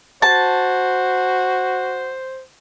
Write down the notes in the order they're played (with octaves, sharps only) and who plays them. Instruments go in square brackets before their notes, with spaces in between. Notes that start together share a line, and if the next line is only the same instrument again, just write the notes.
[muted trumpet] F#4 [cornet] C5 [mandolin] A5